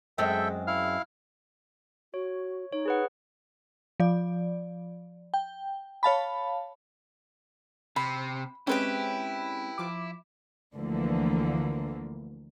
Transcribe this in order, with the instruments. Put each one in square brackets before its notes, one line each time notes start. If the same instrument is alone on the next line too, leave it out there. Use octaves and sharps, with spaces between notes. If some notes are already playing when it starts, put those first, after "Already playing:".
[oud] F#2 G#3 C4 [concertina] A4 E5 G5
[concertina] E4 F5 F6
[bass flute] F#4 [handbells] C#5
[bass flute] D#4 [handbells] C#5
[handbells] G#4 B4 F#5
[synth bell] F3 D5
G5
C#5 F5 A5 B5
[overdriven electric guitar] C3 [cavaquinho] B5
[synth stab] G#3 C4 C#4 [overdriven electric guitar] E4 [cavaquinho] G4 B4 G5
[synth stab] F3 D6
[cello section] D2 D3 E3 F3 A#3